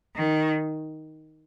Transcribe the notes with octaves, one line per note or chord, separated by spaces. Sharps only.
D#3